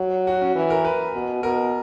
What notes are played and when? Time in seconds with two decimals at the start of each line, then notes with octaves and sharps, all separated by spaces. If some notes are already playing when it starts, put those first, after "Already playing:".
Already playing: F#3
0.27 F#4
0.41 C#4
0.55 E3
0.70 A#4
0.85 B4
1.14 B2
1.43 B2 A#4